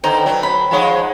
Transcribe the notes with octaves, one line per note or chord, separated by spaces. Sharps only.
D3 D#4 A4 B4 C5 G5
F#3
B5
F3 G#3 D#4 C#5 F#5